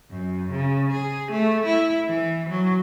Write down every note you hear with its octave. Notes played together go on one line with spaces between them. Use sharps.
F#2
C#3
G#4
A3
E4
E3
F#3